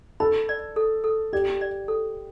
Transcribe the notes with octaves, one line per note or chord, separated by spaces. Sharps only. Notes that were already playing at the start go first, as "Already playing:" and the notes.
A4 B5
D5
A4
A4
G4 D5
D5
A4